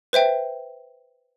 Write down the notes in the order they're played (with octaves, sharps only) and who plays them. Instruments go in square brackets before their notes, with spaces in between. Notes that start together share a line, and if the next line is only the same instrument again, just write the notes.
[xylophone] B4 C5 E5 G5